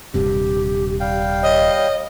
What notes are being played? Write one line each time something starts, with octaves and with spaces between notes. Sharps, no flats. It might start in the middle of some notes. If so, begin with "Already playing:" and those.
D#1 G2 C3 G4
G3 F5 G5
C#5 D#5